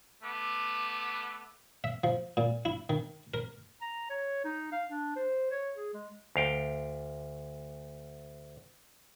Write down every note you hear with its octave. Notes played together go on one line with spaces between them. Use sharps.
A3 B3 D6
E5
F3
A#2
E4
D#3
A#4
A#5
C#5
D#4
F5
D4
C5
C#5
G#4
G#3
D2 F5 G5